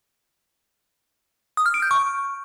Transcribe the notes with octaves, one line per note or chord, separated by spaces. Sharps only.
D#6
F6
D7
G6
C#6